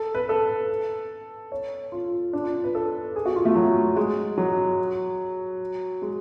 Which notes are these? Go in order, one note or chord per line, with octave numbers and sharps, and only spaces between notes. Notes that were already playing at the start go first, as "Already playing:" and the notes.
Already playing: A4
B4
A4
C#5
F4
D4
F4
B4
A4
G#4
F#4
F4
A3
F#3
G#3
F#3
G#3